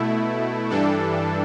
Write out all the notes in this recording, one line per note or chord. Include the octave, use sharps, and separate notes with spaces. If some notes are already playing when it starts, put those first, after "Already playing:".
Already playing: B2 A3 E4
G2 E3 G3 D4 A4